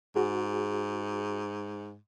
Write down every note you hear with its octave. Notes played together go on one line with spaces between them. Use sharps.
G#2 F#4 G#4